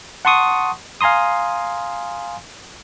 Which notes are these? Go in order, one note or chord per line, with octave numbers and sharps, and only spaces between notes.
F#5 A5 C6 C#6 D#6
F5 G#5 A#5 C6 D#6